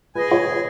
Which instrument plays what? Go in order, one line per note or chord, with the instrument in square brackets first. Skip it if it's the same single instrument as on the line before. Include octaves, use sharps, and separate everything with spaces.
[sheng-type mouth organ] G#4 D#5 G#5 [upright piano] B4
[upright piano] C#5